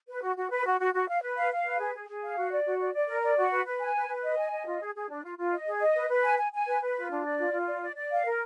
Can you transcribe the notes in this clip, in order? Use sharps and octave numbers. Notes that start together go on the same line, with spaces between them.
B4
F#4
F#4
B4
F#4
F#4
F#4
F5
B4
F5
F5
B4
G#4
G#4
G#4
F5
F#4
D5
F#4
D5
D5
A#4
D5
F#4
B4
B4
G#5
B4
B4
D#5
G#5
D#5
F4
G#4
G#4
D4
F4
F4
D#5
G#4
D#5
B4
B4
G#5
G#5
G#5
B4
B4
F4
D4
D5
F4
F4
D5
D5
D5
F5
A#4